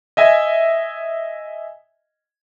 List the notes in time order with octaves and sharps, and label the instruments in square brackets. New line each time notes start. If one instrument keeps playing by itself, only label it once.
[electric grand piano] D#5 E5 G#5